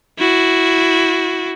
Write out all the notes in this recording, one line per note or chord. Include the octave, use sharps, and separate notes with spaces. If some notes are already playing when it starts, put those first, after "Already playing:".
E4 F#4